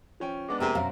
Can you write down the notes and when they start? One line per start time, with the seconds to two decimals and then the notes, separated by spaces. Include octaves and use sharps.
0.20 F3 C#4 G5
0.48 G#3 B3 D4 D6
0.60 C3 A#3 C4 G#4 A#5
0.75 F#2 B2 C4 E5 F5